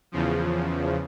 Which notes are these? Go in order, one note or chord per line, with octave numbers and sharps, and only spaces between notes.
E2 C#3 F3